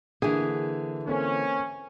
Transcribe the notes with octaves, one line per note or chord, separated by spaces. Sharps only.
D3 E3 A#3 E4 G#4
A#3 C4 C#4 A4